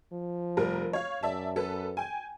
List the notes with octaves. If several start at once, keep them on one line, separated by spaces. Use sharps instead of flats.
F3
F1 G3 A#4
C#5 F5
F#2 D5 E5 A5
A4 B4
G5 G#5